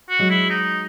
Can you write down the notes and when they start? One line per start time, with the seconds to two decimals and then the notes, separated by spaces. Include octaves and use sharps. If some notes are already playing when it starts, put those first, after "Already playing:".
0.09 F#4
0.19 F#3 G#3
0.30 E4
0.50 D#4